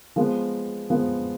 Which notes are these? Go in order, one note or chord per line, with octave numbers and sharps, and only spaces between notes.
F3 G#3 B3
F3 G#3 B3